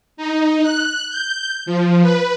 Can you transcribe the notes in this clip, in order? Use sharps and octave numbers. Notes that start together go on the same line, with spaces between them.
D#4
F#6
G6
F3
B4